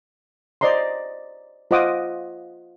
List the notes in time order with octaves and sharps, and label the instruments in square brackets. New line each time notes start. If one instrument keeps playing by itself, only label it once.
[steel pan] C5 D5 D#5 A#5 C6
F4 C5 D#5 F#5 D6 D#6